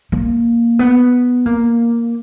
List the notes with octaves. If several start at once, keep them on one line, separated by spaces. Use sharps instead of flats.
A#3
B3
A#3